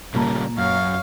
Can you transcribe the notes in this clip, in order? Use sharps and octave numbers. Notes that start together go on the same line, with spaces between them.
A#2 C#3 G3 A#3 A5 A#5
F#2 C#5 F5